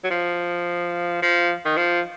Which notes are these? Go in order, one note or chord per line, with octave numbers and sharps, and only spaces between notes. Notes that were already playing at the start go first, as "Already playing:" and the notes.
F#3
F3
F3
D#3
F3